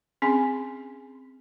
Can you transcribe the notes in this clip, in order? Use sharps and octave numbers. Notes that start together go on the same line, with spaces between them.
C4 C#4 G#4 G#5 C6